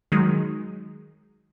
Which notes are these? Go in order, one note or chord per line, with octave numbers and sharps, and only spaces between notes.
D#3 F#3 G#3 D#4